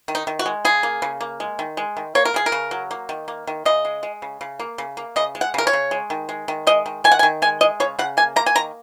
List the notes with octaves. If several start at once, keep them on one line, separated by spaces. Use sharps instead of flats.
D#3
D#4
D#3
F#4
G#3
C#3 G#4
A#3
C#3
A#3
G#3
D#3
G#3
D#3
A#3 C#5
A#4
C#3 G#4
A#4
C#3
F#3
A#3
D#3
A#3
D#3
C#3 D#5
G#3
G#3
C#3
C#3
A#3
C#3
A#3
C#3 D#5
G#3
F#5
C#3 A#4
C#5
C#3
G#3
D#3
G#3
D#3
G#3 D#5
D#3
D#3 G#5
F#5
G#5
D#3
G#3 G#5
G#3 D#5
C#3 C#5
C#3 F#5
A#3 G#5
A#3 A#5
G#5
D#3 A#5